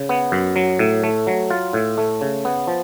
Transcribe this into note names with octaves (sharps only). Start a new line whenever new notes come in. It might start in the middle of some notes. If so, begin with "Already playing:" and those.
Already playing: C#3
B3
F#2
F#3
A2
A3
F#3
F4
A2
A3
C#3
B3
F3